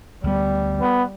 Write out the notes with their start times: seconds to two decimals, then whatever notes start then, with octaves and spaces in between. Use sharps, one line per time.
0.24 D2 G3 B3
0.81 B3